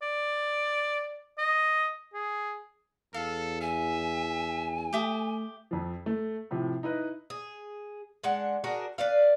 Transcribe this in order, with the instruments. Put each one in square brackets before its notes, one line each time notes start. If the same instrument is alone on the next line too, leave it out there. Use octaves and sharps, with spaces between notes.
[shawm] D5
D#5
G#4
[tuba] E2 [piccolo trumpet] A4 [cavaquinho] F5
[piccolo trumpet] E5 [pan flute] G#5
[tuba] A3 [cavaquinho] G4 E5 D#6
[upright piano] F2 F3
A3
A2 C3 F3
D#4 E4 B4 D#5
[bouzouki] G#4
G#3 D4 F#5
D4 F#4 G#4 A#4
B4 D5 F5